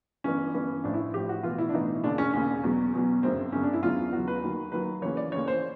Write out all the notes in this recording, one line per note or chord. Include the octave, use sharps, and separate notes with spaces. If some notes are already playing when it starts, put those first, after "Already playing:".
G1 G2 E3 C#4
G1 G2 E3 C#4
A1 A2 F3 D4
E4
A1 A2 F3 G4
F#4
B1 A2 E3 F4
E4
D4
B1 A2 E3 D#4
E1 D#2 C#3 D4
C#4
E1 D#2 C#3 C#4
E2 B2 F#3
E2 B2 F#3
G1 F#2 C#3 C4
G1 F#2 C#3 C#4
D4
E4
E2 C#3 F#3 F4
E2 C#3 F#3 F#4
B4
D#2 D#3 F#3
D#2 D#3 F#3 B4
D#2 C#3 E3 C#5
D5
D#2 C#3 E3 C#5
C5